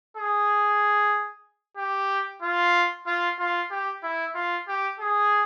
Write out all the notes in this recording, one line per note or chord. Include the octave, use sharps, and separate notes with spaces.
G#4
G4
F4
F4
F4
G4
E4
F4
G4
G#4